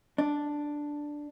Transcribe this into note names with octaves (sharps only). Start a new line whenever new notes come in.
D4